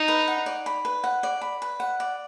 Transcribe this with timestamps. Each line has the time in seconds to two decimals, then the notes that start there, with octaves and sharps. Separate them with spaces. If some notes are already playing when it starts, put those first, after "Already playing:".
Already playing: D#4
0.08 B4
0.28 F#5
0.46 D5
0.66 B5
0.85 B4
1.04 F#5
1.23 D5
1.42 B5
1.62 B4
1.80 F#5
2.00 D5